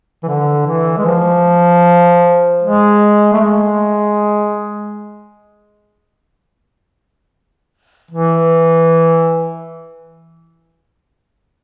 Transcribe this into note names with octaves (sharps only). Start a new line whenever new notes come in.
E3
D3
E3
G#3
F3
G#3
A3
G#3
E3